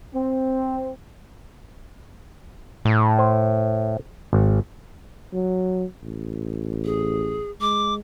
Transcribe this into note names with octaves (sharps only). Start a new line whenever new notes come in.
C4
A2
C5
G#1
F#3
A1
G#4
G#3 D6